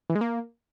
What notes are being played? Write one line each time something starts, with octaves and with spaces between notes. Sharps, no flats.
E3
G#3
A#3